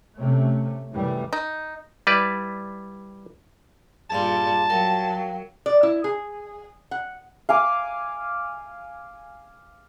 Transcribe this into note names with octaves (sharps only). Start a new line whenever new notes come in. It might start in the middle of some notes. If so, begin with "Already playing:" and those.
C3 A3 C#4
F1 F#2 E3 G3 A3
D#4
G3 E4 B4 D5
G2 A#2 G3 G#4 F5 A5 C6
F#3 A#4 F5 G5
D5
E4
G#4
F#5
F5 G#5 D6